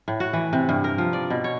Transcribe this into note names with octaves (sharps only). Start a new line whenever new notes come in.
A2
F#4
E3
C3
G2
A#4
F3
D5
B2
C#5